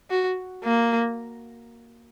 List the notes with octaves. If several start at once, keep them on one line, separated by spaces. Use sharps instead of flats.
F#4
A#3